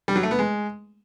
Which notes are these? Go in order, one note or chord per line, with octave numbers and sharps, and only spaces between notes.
G3
F#3
A3
B3
G#3